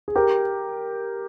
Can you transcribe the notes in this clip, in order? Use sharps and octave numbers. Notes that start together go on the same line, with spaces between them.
G#4
G4 A#4